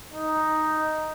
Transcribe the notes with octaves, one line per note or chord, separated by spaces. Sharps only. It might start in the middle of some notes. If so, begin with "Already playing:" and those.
D#4